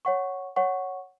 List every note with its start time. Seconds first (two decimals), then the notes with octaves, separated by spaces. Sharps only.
0.05 C#5 F#5 C#6
0.56 C#5 F#5 C#6